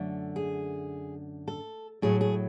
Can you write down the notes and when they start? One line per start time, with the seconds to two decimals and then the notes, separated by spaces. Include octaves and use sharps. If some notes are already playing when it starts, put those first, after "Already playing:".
Already playing: F#2 D3 A3
0.36 G#4
1.48 A4
2.02 A2 F#3 A3 G#4
2.21 G#4